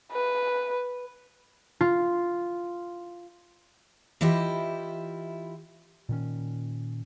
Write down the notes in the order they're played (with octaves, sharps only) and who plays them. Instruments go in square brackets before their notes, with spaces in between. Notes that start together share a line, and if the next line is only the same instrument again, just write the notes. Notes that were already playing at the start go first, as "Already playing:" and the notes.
[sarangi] B4
[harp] F4
[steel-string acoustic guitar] E3 E4 F4 G4 D#5
[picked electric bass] A#2 D#3 C#4